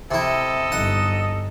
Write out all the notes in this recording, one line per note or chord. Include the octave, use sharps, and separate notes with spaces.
C3 E4 A4 D#5
G1 D#4 F#5